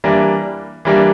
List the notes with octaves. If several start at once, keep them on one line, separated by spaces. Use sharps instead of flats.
E3 G3 A#3 D4
E3 G3 A#3 D4